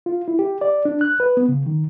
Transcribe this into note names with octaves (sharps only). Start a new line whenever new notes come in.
F4
E4
G4
D5
D4
F#6
B4
B3
C#3
D#3